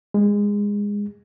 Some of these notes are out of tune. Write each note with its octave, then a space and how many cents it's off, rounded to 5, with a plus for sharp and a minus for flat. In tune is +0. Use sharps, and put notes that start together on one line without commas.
G#3 -20